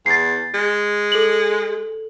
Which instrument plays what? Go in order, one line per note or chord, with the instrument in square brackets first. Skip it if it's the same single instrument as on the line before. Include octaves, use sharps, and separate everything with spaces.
[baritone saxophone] E2 [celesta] A6 C7
[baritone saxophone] G#3
[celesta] A4 F#7